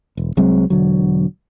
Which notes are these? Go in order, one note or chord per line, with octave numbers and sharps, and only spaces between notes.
E1
C2 F#3 G#3 C4
E1 D3 F#3